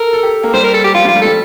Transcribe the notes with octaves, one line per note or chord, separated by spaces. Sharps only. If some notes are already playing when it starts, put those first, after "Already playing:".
Already playing: A4 A#4
A4
G4
A#3
G3 C5
A#4
A4
G4
F3 F4
G3
F4
A3
G3 A4